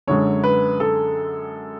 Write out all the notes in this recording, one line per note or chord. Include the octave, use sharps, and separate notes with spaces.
F#2 D3 G#3 C#5
B4
A4